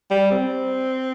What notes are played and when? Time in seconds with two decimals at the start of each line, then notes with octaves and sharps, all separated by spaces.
0.11 G3
0.31 C4